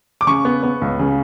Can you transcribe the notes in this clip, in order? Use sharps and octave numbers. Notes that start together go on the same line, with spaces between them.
D6
C#3 C#6
B3
B3
C#2
C#3